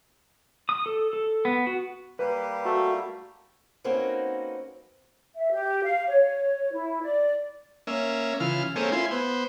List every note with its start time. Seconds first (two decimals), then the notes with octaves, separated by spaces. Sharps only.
0.69 D#6
0.86 A4
1.13 A4
1.45 B3
1.67 F#4
2.19 G3 A#3 G4 B4
2.65 A3 F#4
3.84 A#3 C4 C#4 D#4 F#4 B4
5.36 E5
5.52 G4
5.83 F5
6.08 C#5
6.73 E4
7.02 D5
7.87 A#3 C#4 E5
8.40 C#3 E3 F4 F6
8.76 A3 A#3 C4 C#4 G#4
8.92 E4 F4 G#5 C6
9.11 B3 C5